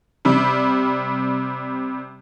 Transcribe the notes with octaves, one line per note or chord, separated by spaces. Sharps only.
C3 G3